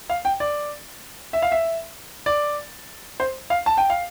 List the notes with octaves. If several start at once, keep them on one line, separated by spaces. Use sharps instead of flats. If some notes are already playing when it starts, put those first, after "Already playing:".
F5
G5
D5
E5
F5
E5
D5
C5
F5
A5
G5
F5